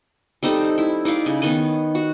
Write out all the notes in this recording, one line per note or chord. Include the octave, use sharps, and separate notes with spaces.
G3 C4 D#4 A4
E4
D#4 E4 D5 F5
C#3
D#3 B3 C#5 D#5
F#4